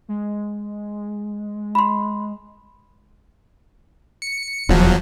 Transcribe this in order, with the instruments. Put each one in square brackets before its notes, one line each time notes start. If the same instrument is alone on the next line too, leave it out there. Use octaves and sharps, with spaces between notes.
[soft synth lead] G#3
[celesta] B5 C6
[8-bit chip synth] C#7
[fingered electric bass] D#1 [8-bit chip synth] E2 F3 F#3